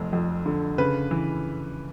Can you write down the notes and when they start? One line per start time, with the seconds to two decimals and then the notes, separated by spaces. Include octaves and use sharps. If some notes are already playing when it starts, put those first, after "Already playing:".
Already playing: F1 F2
0.13 F2
0.46 D3
0.78 C#3 B4
1.11 E3